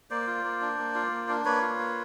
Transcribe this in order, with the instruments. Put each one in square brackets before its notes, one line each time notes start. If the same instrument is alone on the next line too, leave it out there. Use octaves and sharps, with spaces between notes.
[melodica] A#3 C5 D5
F4
A#3
D4
A#3
F4
A#3
D4
A#3 B4 C#5
F4
A#3